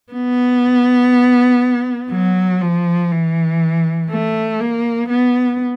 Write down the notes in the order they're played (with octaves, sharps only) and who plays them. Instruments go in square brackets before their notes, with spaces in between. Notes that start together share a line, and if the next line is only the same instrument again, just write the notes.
[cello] B3
F#3
F3
E3
A3
A#3
B3